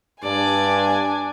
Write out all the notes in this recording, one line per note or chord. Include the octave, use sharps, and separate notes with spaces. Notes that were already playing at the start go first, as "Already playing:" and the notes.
G2 D4 D5 G#5